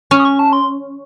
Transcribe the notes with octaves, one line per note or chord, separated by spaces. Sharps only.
C#4 C#6
D#6
C#6
A5
C6